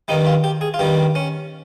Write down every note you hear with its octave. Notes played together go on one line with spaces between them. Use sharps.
G2 D#3 G3 D#4
F4
G4
G#4
F4
G2 D#3 G3 G4
C#4